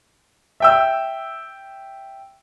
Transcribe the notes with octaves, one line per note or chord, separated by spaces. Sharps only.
E5 G5 E6